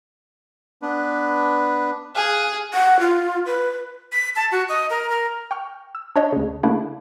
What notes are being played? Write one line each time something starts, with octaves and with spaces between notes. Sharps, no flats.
B3 D4 B4
G#4 F5 F#6
F#5
F4
B4
B6
A5
F#4
D#5
A#4
A#4
G5 C#6 F6
E6
D4 C#5 D#5
D2 C#3
C#3 A3 A#3 D4 E4